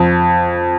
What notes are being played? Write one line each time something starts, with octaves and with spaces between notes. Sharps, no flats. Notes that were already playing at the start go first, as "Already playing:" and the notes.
Already playing: F2